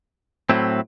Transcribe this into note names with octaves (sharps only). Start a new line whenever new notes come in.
A2 F#3 C4 E4